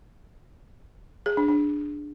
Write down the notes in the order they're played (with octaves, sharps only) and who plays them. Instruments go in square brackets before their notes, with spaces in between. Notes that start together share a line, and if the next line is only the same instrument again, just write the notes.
[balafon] G#4
D4
D4